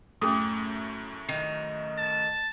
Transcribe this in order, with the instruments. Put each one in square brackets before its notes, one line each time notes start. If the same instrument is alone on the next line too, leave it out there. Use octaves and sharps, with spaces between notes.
[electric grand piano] F#2 A2 A3 [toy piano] C#4 G#4 D#6
[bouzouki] D#3
[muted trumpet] A5